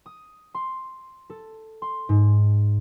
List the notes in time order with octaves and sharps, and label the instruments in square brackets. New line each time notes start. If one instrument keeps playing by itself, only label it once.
[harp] D#6
C6
A4
C6
G#2